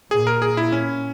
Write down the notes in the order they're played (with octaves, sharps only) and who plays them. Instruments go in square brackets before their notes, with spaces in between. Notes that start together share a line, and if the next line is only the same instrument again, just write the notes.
[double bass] A#2 [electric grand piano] G#4
[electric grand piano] A#4
G#4
E4
C#4